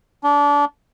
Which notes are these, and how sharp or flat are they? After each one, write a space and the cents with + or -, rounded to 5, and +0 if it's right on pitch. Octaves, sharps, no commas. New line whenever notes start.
D4 -25